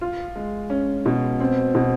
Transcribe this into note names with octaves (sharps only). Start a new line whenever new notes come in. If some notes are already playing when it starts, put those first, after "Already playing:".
F4
G#3
C#4
B2
C4
B2